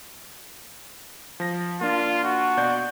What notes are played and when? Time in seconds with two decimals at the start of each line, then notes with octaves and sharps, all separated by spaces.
1.40 F3 A#6
1.81 A#3 D4 F4
2.24 F#4
2.57 B2 D5 G6